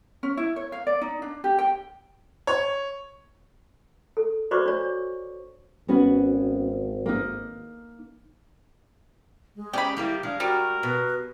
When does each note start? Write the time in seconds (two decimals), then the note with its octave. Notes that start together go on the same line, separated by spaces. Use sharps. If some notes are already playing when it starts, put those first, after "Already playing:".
0.23 C#4
0.37 E4
0.56 C#5
0.72 F5
0.87 D5
1.01 D#4
1.22 D4
1.44 G4
1.59 G5
2.47 C#5
4.17 A4
4.51 F#4 B4 C5 D5 C#6 D6
4.66 D4 C#5
5.88 G#1 B3 C#4 F#4
7.06 A#3 D#4
9.56 G#3
9.73 C#4 G4 D5 G5 B5
9.97 D#3 G3 A#3 E4
10.23 G#3 D4 F5
10.40 G3 F#4 A#4
10.83 B2 B4